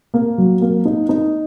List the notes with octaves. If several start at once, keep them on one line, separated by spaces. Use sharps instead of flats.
A#3
F#3
A#3
D#4
D#4